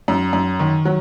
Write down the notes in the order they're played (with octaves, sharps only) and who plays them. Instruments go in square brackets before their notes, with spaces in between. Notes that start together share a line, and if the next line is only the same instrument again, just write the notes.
[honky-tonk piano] F#2
F#2
D#3
F#3